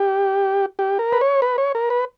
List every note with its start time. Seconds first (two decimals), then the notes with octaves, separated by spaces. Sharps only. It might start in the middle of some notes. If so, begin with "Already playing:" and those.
Already playing: G4
0.79 G4
0.99 A#4
1.13 B4
1.21 C#5
1.42 B4
1.58 C#5
1.75 A#4
1.90 B4